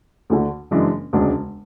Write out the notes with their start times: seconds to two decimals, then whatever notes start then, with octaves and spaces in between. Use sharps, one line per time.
0.30 D2 D3 A3
0.71 F#1 F#2 E3 G#3 D4
1.13 E1 D2 C#3 G#3 D4